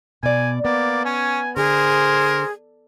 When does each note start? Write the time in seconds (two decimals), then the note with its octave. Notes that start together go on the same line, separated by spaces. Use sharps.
0.23 B2 D5 G#5
0.65 A#3 B3 D5
1.05 C#4 G#5
1.57 D3 G#4 A#4 C5